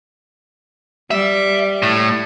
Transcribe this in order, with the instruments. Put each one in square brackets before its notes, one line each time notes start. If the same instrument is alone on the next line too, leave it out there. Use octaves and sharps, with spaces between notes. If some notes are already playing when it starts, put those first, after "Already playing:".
[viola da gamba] G3 [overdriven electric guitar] E5
[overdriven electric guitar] A2